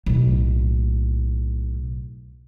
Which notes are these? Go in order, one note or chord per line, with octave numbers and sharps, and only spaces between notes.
B1 A2